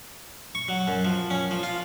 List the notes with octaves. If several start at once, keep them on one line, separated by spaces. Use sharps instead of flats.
C#6
F#3
F#2
F3
C#4
F3
F4